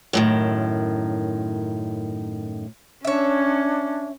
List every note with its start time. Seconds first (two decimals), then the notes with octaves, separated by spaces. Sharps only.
0.13 F#2 A2 D#3
3.05 C#4 D4 C#5 E5